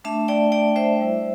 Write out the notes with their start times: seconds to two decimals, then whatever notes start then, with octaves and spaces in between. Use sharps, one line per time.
0.04 A3 D4 E5 A5
0.28 D5 G5
0.52 D5 G5
0.76 C5 E5
1.00 G3 E4